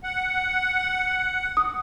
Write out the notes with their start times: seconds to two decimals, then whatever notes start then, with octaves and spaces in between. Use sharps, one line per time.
0.03 F#5
1.57 D#6